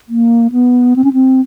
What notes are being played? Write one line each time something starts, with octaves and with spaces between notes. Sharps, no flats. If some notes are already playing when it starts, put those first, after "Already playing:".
A#3
B3
C4
C#4
C4